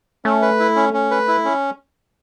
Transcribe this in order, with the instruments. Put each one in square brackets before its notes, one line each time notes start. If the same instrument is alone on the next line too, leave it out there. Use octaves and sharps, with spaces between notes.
[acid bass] A3 [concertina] C#4
[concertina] B4
E4
C#4
C#4
B4
E4
C#4